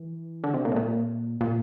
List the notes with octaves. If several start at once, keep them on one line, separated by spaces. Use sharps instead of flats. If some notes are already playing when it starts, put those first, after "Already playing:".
Already playing: E3
D3
C3
A#2
A2
A#2
A#2